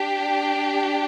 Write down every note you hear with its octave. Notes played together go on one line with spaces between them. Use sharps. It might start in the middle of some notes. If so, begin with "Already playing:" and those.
Already playing: D4 G4